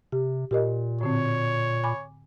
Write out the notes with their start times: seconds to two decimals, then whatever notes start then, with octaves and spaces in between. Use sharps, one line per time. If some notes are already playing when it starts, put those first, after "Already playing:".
0.12 C3 G4
0.51 A#2 G4 A#4 D#5
1.01 A2 D3 C4 C#5
1.83 G#5 B5 D6